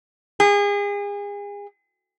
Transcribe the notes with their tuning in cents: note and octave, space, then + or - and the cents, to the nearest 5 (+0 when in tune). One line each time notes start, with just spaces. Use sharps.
G#4 -35